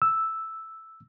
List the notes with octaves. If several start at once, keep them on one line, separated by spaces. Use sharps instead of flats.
E6